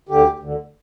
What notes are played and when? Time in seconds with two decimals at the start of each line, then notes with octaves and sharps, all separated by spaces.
0.09 D2 D3 G4
0.39 D2 D3